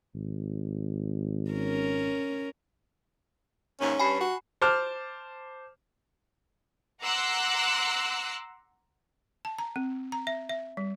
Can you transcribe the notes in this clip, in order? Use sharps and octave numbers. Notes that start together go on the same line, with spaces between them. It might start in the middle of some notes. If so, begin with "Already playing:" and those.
G#1
C#4 A#4
D#2 G#2 C#4
G2 G#5 B5 C7
F#4
C5 A5 D6 F6
F#5 A#5 C6 D6 E6 F#6
A5
A#5
C4
A#5
E5
E5
G3